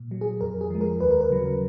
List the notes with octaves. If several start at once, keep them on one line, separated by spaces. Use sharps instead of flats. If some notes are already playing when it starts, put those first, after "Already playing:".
Already playing: A#2
F#3
G#4
F2 A#4
G#4
F3 G#3
A#4
D#2 B4
A#4
B4
C#3 F#3